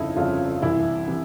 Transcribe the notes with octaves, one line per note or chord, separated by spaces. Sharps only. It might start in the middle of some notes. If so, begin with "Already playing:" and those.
Already playing: G1 F2 C#3 D#4 E4
G1 F2 C#3 F4
C2 C3 E3 E4
C3 E3